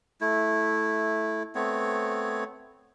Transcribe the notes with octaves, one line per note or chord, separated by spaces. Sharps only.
A3 E4
A3 B3 C4 C#5